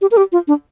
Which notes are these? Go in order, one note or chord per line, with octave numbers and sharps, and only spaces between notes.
G4
A#4
G4
F4
D4